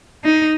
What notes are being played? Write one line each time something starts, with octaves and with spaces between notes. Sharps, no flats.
D#4